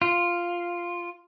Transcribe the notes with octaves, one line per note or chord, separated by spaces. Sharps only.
F4